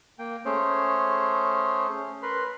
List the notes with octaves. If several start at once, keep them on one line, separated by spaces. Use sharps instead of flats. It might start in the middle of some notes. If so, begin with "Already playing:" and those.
A#3 G5
A3 C#4 G#4 C5 C#5
A#4 B4 B5 C6